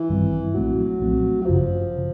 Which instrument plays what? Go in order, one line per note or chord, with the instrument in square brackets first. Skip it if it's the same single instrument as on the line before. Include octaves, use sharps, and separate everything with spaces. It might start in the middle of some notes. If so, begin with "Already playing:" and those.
Already playing: [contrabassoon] E3
[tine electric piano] A1 G2 D#3 G3 C4
[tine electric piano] B1 A#2 F3 A3 C4 [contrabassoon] F#3
[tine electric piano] B1 A#2 F3 A3 C4
[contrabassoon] F#3
[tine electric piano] G#1 F#2 C#3 [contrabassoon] F3
[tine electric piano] C#3